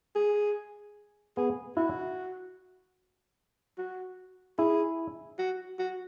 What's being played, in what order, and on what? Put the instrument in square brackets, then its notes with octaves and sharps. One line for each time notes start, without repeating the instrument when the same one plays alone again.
[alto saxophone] G#4
[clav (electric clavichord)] B3 [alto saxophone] G#4
[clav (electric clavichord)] E4 [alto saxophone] F#4
[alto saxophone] F#4
[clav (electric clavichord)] E4 [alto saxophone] G#4
[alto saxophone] F#4
F#4